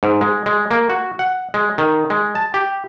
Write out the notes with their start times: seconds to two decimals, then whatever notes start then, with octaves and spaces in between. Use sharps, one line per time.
0.03 G#2
0.21 G#3
0.46 G#3
0.71 A#3
0.90 F#4
1.19 F#5
1.54 G#3
1.78 D#3
2.10 G#3
2.35 A5
2.54 G4